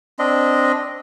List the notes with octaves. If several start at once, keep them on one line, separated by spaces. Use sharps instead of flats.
C4 D4 D#5